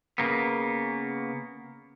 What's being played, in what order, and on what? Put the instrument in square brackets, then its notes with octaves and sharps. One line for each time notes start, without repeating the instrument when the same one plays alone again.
[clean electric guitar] C#3 A#3 B3